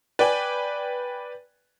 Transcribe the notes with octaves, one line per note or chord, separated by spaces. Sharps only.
B4 D5 G5 G#5